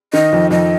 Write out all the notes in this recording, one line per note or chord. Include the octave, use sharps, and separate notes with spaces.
D#3 D#5
F2
F2 D#5